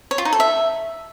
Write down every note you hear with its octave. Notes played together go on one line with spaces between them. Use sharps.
C#5
F4
D#4
A4
E5